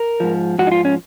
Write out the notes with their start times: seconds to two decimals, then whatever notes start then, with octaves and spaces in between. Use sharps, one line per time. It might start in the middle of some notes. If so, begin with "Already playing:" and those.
Already playing: A#4
0.20 G#2 F3
0.58 G#2 F3 F#4
0.67 D#4
0.72 F4
0.85 C#4